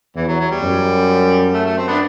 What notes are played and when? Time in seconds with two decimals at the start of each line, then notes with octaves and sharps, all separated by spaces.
0.16 E2 E3
0.28 F#3
0.40 F#3
0.51 G3
0.62 F#2
1.54 A3
1.66 A3
1.77 C4
1.88 B3 D4